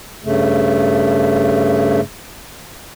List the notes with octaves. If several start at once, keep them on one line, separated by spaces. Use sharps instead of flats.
G2 C#3 A3